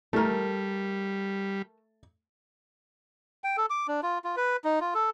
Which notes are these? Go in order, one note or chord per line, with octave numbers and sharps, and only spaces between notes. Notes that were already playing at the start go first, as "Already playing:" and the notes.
G3 A3 A4 A#4
G5
A4
D6
D4
F4
F4
B4
D#4
F4
A4